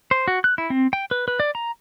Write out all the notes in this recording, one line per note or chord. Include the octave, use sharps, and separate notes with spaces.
C5
F#4
F#6
E4
C4
G5
B4
B4
D5
A#5